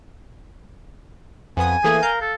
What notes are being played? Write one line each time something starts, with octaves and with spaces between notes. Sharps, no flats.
F2 B3 G#5 D#6
E3 A3 A#3 G#4
A#4 F5 G6
A4